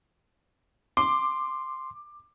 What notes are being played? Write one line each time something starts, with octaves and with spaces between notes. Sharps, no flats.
C6 D6